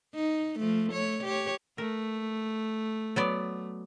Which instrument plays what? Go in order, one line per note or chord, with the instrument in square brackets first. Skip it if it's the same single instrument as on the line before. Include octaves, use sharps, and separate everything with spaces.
[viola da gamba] D#4
F3 A3
A3 C#5
G4 C#5
[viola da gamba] A3 [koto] A#4
[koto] F#3 B3 D5